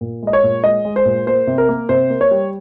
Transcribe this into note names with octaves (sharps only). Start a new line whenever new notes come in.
A#2
G#3 D#5
C#5
A#2
G#3 D#5
G#3
C5
A#2
A#3 C5
C3
A#4
A#3
C3 C5
A#3
C#5
G3